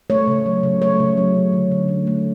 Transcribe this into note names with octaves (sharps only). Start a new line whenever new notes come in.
A3 C#5
C#3
F#3
C#3
A3 C#5
C#3
F#3
C#3
D3
D3
A3
A3